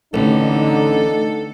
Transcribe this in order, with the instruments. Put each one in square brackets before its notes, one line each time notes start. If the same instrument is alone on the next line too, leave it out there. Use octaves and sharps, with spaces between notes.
[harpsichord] A1 [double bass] D3 [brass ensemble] D#4 [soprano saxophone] A4